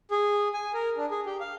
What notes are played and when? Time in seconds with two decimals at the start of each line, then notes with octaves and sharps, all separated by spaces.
0.11 G#4
0.54 G#5
0.74 A#4
0.97 D4
1.11 G#4
1.26 G4
1.40 F5